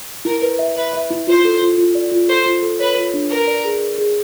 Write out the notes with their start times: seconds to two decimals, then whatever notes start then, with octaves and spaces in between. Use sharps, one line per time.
0.25 E4 A#4
0.42 B4
0.59 E5
0.76 B4 E5
0.93 E5
1.11 E4
1.27 F4 C5
1.45 A4
1.61 F4
1.78 F4
1.95 D5
2.12 F4
2.28 A4 C5
2.46 F4
2.63 A4
2.79 B4 C#5
2.96 F4
3.14 D4
3.31 A#4 B4
3.47 D5
3.64 G#4
3.81 G#4
3.98 G#4